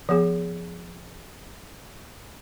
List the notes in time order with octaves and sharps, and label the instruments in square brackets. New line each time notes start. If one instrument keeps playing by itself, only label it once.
[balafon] F3 B3 G#4